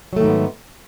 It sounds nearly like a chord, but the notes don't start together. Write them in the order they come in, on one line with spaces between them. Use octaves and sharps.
F#3 A3 D#3 G#2 B3